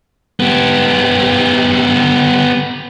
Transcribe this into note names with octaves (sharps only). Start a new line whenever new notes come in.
B3 G4